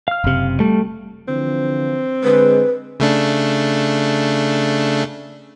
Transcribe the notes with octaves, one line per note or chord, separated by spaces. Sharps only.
F5 F6
F#1 C3
G3 A3
D3 E3 F3 C4
D3 G#3 B4
C#3 A3 D4